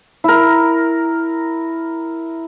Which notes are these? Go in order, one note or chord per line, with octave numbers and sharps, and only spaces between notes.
E4 A#4